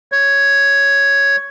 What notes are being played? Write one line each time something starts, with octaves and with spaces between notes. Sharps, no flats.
C#5